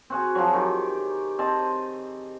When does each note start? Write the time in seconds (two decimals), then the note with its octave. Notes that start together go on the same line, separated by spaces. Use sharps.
0.10 C4 F#4 G#4
0.35 F3 F#3
0.54 D#3 G4 C#6
1.39 C4 D#5 A5